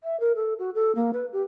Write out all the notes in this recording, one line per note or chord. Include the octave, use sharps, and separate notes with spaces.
E5
A#4
A4
F#4
A4
A#3
B4
G4